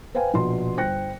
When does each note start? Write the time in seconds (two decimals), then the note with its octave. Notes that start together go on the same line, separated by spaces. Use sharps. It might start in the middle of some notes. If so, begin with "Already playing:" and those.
0.15 B4 C5 F5 G5 G#5
0.34 A#1 B2 C6
0.77 G1 C5 G5 F#6 A#6 C#7